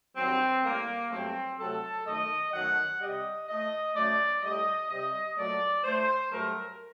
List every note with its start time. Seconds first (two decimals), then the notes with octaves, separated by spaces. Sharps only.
0.16 G2 D#3 F#3 C4
0.64 A2 G3 A#3
1.11 G2 F#3 A3 C4
1.59 C3 F#3 A3 A4
2.06 F#2 D#3 A3 D#5
2.53 F#2 D#3 F#3 A3 F#5
3.00 C3 G3 D#5
3.48 A2 A3 D#5
3.95 F#2 F#3 A3 D5
4.42 A2 G3 D#5
4.89 C3 G3 D#5
5.37 A#2 F#3 A3 D5
5.84 A2 A3 C5
6.31 G2 F#3 A3 A#4